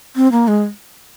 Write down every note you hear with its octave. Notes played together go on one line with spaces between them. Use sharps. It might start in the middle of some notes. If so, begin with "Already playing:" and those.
C4
A#3
G#3